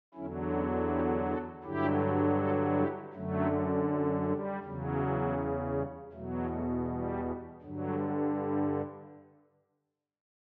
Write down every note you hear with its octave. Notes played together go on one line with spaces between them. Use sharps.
E2 D3 F#3 C#4 E4
C#4 E4
E4 G4
F#4 A4
G2 D3 F#3 E4 G4
F#4 A4
E4 G4
F#2 D3 F#3 A3
G3
E2 C#3 F#3
F#3
G3
E2 B2 F#3 A3
F#3 A3
G3
G2 D3 F#3
F#3
G3